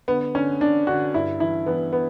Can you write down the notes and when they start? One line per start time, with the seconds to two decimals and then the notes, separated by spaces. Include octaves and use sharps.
0.08 D3 B3
0.35 D3 C#4
0.61 D3 D4
0.87 D3 F#4
1.14 G2 E4
1.40 E3 E4
1.66 E3 B3
1.93 B3